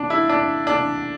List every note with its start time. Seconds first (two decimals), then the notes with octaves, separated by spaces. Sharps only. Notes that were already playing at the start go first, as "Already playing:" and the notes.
Already playing: D4
0.10 E4
0.29 D4
0.67 D4